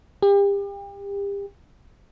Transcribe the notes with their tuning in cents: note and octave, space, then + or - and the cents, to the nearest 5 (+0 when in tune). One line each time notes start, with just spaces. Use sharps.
G4 +35